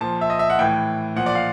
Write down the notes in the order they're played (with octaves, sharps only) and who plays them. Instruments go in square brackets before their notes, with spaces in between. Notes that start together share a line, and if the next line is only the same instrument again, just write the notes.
[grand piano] A#2 F3 A5
E5
D#5
E5
F#5
A2 E3 G5
A#2 F3 F#5
D5
F5